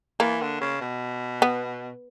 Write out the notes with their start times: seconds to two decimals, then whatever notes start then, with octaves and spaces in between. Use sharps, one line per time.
0.20 E3 A#3
0.41 D3
0.61 C#3
0.81 B2
1.42 B3